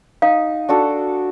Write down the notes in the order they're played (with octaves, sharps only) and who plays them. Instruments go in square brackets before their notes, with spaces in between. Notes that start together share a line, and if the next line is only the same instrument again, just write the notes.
[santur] D#4 [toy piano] F5
[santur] D4 F#4 A4